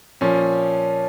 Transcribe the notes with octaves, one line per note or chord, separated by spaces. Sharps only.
A#2 F3 C#4